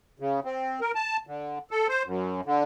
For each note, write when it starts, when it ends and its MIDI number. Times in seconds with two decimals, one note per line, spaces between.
0.20 0.40 49
0.44 0.80 60
0.81 0.92 70
0.95 1.17 81
1.27 1.59 50
1.71 1.87 69
1.89 2.03 72
2.05 2.41 42
2.45 2.64 50